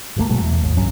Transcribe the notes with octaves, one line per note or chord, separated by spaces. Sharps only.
G1 D2 A3 A#3
B2 F#3 G#3 A3
E2
G#1 D#2
C#2 G2 F#3 C#4